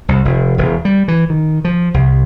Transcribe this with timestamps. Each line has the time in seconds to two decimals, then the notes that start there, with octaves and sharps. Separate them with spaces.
0.09 C2
0.25 F1
0.58 E1
0.85 G3
1.08 E3
1.30 D#3
1.65 F3
1.94 C2